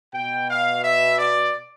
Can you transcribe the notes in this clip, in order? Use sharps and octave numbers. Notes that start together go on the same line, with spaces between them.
B2 G5
F5
E5
D5